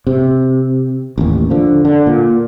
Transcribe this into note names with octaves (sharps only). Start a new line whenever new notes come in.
C3
A1 D#2
D3 F3
D3
A#2